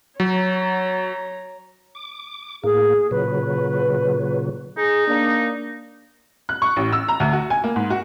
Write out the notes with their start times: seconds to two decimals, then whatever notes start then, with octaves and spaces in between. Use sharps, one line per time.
0.20 F#3 C#5 A#5
1.95 D6
2.64 A2 A#3 G#4
3.11 A#2 C#3 F#3 B4
4.78 D#4 G#4
5.08 A#3 D4
6.49 F#6
6.62 C#6
6.76 A1
6.92 E6
7.08 A#5
7.20 D2
7.33 F#4
7.50 G#5
7.64 A#3
7.76 G#2
7.90 F#4